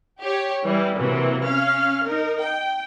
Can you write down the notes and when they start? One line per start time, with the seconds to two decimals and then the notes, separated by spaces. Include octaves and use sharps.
0.20 G4 C#5
0.64 E3 G3
0.97 C3 E3 F#3 A#3
1.41 C#4 F5 F6
2.03 D#4 A#4
2.41 G5